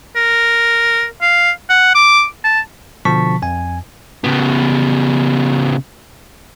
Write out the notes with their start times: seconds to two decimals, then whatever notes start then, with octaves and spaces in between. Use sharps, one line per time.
0.16 A#4
1.22 F5
1.70 F#5
1.95 D6
2.44 A5
3.05 B2 D3 F3 A5 C#6 B6
3.42 F2 G#5
4.24 C#3 B3